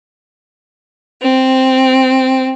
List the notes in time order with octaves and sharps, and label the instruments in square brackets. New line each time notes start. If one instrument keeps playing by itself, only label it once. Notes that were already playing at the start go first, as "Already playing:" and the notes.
[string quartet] C4